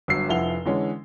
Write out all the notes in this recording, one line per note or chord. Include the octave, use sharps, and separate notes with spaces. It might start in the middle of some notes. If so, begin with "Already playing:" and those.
G1 F#3 E6 C7
F1 F3 E4 F#5 F7 G7
D3 E3 G#3 C#4